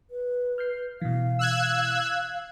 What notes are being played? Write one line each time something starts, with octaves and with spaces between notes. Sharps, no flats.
B4
F6 G6 C7
B2 E3 F5
E6 F#6 G#6